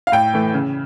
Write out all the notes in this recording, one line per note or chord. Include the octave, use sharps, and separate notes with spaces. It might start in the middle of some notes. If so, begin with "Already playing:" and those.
F5
A2 G5
E3 A3
C#3